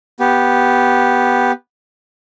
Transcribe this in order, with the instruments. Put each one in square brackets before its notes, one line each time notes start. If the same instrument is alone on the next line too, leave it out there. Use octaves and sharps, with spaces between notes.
[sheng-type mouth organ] B3 G4